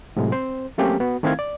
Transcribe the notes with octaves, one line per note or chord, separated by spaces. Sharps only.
A2 C3 F#3 G#3
C4 C5
F#3 A3 A#3 C4 C#4 G4
B3 F#4
D#3 A3 C4 E4 F5 G#6
D5